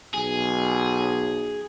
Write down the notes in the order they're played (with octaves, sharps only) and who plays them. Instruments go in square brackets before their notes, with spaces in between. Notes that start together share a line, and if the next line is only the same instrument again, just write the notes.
[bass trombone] B1 [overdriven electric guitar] G#4